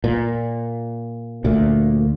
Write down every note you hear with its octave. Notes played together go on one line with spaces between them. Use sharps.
A#2
D2 A#2